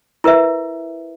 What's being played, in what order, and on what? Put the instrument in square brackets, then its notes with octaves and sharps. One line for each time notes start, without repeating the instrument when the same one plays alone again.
[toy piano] E4 A#4 B4 E5